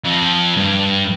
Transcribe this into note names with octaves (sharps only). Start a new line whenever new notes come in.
F2
G2